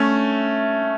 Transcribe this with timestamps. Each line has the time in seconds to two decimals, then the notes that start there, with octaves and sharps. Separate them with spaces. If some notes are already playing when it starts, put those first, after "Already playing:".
Already playing: A3 C#4